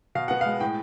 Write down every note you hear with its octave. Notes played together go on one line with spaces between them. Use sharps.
B2 F5
B3 F#5
G#3 F5
A2 G5